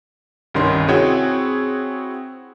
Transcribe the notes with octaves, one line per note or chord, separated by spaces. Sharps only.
C2 G2 D#3 C#4 C6
C4 E4 F#4 G#4 C#5 G5